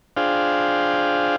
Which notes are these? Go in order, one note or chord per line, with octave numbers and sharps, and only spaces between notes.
D4 F4 G#4 C5 F5 G5